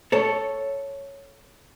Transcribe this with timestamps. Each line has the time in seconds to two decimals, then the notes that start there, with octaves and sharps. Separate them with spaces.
0.12 A4 C#5